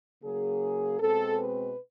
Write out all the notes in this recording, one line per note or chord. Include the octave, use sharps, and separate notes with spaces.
C#3 F#3 A#3 G#4
B2 G#3 C4 A4
B4